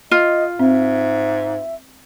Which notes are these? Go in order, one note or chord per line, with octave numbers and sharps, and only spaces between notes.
F4 D#5
G#2 C4 E5